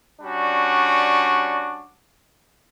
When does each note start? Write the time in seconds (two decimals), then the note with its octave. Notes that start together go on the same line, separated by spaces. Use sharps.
0.21 G3 C#4 D4 F#4